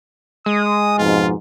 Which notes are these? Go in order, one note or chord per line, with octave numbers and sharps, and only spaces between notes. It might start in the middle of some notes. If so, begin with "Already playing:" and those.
G#3 D#6
F2 G#2 B2 F4